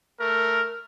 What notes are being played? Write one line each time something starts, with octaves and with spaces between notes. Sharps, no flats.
A3 A#4